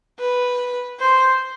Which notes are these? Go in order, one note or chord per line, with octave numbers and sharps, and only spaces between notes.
B4
C5